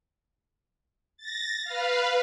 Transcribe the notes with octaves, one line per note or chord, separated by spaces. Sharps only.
A6 A#6
B4 F5